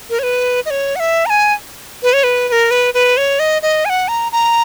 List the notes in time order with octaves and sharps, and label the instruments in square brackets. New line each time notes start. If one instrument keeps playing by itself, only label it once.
[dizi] A#4
C#5
B4
D#5
C#5
F#5
E5
A#5
G#5
B4
C#5
B4
B4
A#4
B4
B4
C#5
D#5
D#5
G#5
F#5
A#5
A#5